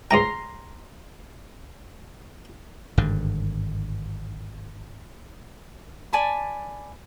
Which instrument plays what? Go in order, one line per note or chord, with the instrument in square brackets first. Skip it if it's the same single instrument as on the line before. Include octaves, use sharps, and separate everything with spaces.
[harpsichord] C#2 G#2 G5 [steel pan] A#5 C6
[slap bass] G#1 G2 D3
[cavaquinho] D5 G#5 A5 B5